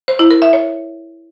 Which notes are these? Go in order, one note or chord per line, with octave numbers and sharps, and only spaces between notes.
C5
E4
A#4
E5
C#5